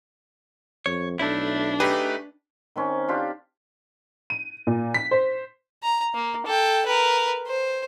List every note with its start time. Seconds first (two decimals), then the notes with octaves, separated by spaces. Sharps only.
0.86 F2 C#5
1.19 B1 A3 D4 E4
1.80 A3 D#4 G4 G#4 B4
2.76 D#3 C4 C#4
3.08 D4 F4 G4 F5
4.30 D#7
4.67 A#2
4.94 B6
5.11 C5
5.83 A#5
6.14 A#3
6.46 A4 G5
6.86 A#4 B4
7.47 C5